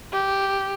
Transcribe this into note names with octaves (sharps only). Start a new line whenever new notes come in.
G4